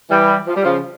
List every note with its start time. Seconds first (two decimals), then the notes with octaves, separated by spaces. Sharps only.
0.09 E3 G3
0.47 F3
0.55 G3
0.64 C#3 F3